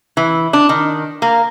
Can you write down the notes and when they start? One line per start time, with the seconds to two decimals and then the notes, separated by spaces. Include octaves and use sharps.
0.17 E3
0.53 D4
0.69 D#3
1.22 A#3